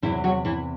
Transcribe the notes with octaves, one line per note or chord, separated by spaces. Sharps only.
E2 C3 E3 F#3 E4
F#3 F#4
E3 E4